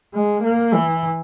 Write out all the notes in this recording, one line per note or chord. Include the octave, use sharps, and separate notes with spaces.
G#3
A#3
E3